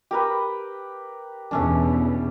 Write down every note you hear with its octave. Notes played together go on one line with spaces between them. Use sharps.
G4 A#4 B4
E2 B2 A3 C#4 D4